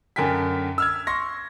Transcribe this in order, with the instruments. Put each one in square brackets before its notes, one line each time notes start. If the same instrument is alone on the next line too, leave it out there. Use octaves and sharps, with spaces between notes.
[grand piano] F#2 D3 A#4 G5 G#5 B6
E6 F6 G#6
C6 C#6 A#6